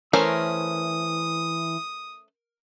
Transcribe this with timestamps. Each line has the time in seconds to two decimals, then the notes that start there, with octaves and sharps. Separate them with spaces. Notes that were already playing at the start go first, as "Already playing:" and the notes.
0.13 E3 A3 C#4 A#4 C5 D#6